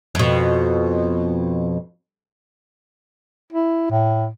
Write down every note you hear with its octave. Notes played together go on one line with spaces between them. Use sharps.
F2 B2
E4
A2